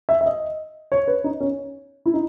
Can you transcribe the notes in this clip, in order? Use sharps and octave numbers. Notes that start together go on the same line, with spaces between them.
E5
E5
D#5
C#5
B4
D#4
C#4
E4
D#4